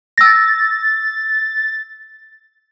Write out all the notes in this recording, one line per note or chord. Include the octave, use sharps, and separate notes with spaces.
E6 A6 A#6